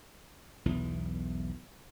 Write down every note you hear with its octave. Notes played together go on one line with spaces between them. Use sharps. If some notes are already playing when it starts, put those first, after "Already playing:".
B1 E2 E3